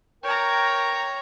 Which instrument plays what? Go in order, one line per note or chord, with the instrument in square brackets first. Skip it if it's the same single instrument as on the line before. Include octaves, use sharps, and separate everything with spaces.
[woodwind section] A#4 G5 [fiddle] C#5 A#5